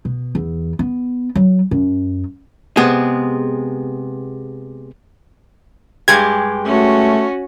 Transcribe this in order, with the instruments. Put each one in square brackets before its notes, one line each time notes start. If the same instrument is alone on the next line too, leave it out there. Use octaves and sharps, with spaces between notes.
[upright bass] B2
E2
B3
F#3
F#2
[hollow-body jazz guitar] C3 G#3 B3 G#4
[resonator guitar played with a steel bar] G2 G#3 G4 [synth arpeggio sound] G#6
[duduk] A3 [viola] C#4 F#4